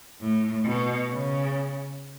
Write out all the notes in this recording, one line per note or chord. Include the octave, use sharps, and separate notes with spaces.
A2
B2
C#3